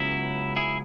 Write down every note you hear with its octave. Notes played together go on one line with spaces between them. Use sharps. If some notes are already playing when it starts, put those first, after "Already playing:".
Already playing: C#2 C#3 F#3 B3 E4
E4 G#4